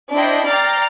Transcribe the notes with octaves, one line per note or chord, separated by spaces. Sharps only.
D4 E4 C5 D#5 G5 C7
D5 G5 A#5 F6 A6 C7